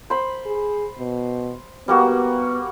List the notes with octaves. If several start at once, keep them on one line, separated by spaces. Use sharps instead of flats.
C5 B5
G#4
B2
G3 A#3 B3 F#4